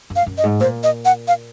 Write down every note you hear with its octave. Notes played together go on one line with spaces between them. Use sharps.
F#2
F5
F#2
D#5
G#2
A#2 C5
D#5
F#5
F5